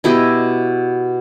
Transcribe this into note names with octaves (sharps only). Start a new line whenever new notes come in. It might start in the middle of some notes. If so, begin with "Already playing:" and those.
B2 E4 G4 D#5